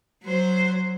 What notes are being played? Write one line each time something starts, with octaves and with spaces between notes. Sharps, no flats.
F#3 C5